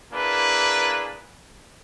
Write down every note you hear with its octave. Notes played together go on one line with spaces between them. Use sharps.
A#3 D4 E4 G#4 B4